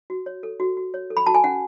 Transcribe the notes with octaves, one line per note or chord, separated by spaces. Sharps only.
F#4
C#5
A4
F#4
F#4
C#5
A4
B5
F#4 A5
G#5
C#4 F#5